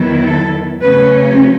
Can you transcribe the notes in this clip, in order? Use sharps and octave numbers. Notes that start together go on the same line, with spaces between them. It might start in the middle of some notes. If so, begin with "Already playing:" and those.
Already playing: E2 D#3 F#3 B3 E4
A4
C#3 F#3 A3 C#4 B4